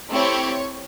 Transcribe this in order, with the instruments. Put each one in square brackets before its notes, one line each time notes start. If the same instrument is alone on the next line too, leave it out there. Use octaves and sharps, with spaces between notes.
[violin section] A3 C4 E4 G4 C#5